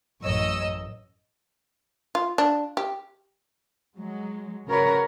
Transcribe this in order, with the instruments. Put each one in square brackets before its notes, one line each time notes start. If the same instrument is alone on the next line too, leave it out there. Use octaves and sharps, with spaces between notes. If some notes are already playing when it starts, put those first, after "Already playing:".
[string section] A1 F#2 C#5 D#5 E6
[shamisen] F4
D4
G4
[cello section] F#3 G#3
C#3 F#4 A#4 B4 C#5